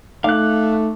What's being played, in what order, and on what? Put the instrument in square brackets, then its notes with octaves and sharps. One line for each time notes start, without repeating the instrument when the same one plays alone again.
[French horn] A3 [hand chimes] D#4 D6 [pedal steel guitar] F5 F#6